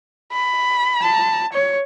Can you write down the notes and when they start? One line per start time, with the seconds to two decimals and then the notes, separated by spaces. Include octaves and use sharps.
0.32 B5
1.02 A5
1.53 C#5